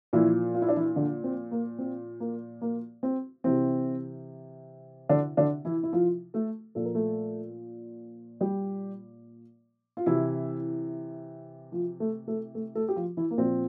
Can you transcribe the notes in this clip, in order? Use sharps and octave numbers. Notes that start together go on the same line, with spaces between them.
A#2 E3 F3 E4
F4
E4
D4
E3 E4
D3 D4
C4
A#3
C4
A#3
A#3
C4
C3 E3 C4
D3 D4
D3 D4
E3 E4
E4
F3 F4
A3 A4
A#2 F3 A4
A#4
A3 A4
G3 G4
F4
C3 E3 E4
F3 F4
A3 A4
A3 A4
A3 A4
A3 A4
G4
F3 F4
E3 E4
A#3
A#2 F3 C4